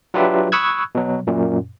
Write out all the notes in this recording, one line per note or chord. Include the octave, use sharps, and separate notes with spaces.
F#3 D4 F4 G4 B4 E5
B5 C#6 D#6 E6 F#6 G#6
B2 F#3
F#2 A#2